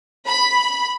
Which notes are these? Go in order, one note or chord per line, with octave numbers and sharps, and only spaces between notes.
B5